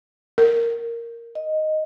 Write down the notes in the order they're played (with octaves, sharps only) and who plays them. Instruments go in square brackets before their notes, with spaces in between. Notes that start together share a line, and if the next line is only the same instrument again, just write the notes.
[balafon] A#4
[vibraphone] D#5